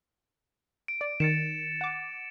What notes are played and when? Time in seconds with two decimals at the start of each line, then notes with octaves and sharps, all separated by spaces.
0.88 D7
1.01 D5
1.20 D#3 A6 C#7 E7
1.81 F#5 D6